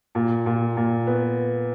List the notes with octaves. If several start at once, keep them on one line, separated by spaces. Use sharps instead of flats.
A#2
A#2
A#2
B3